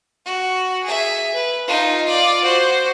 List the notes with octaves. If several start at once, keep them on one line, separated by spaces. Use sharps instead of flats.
F#4
G#4 E5
B4
D#4 F4
F4 D5
F#4 C5